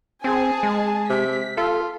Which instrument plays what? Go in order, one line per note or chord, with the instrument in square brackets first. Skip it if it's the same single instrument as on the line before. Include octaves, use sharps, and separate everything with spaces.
[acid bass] C4 [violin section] G#4 G#5 A5
[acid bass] G#3
[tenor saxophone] C3 [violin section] B6
[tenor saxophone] F4 [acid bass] A4